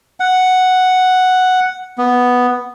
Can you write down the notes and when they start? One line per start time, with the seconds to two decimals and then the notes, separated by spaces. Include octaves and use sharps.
0.20 F#5
1.98 B3